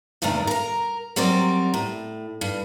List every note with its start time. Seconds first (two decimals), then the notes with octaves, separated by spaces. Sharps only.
0.22 E2 G2 C3 D#3 A3
0.47 A#4 A#5
1.16 F#3 G3 C4 A#4 D5
1.74 A2
2.41 G2